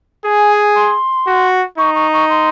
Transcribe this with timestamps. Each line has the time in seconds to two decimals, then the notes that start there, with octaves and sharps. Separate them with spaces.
0.24 G#4 G#5
0.75 C6
1.27 F#4
1.78 D#4 C#6
1.95 C#6
2.13 C#6
2.30 C6